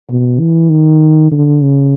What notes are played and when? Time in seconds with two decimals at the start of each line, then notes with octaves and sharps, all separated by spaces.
0.10 B2
0.40 E3
0.70 D#3
1.31 D3
1.62 C#3